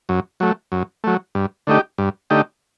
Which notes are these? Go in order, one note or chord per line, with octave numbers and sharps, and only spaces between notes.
F#2
F#3 A3
F#2
F#3 A3
G2
D3 A3 D#4 G4
G2
D3 A3 D#4 G4